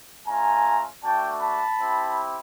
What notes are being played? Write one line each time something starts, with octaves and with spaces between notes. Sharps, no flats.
A3 C#4 F4 G#5 A#5
A3 D4 F#4 G5 A5
A5 B5
C4 E4 G4